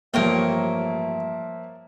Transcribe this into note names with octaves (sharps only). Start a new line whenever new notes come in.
A1 G2 F3 A#3 A#4 C#5 E5 G5